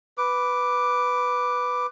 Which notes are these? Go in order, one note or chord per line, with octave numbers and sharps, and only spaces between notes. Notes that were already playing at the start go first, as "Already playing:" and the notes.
B4 D6